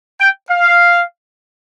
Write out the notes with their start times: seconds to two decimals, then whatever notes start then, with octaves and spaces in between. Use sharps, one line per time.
0.20 G5
0.50 F5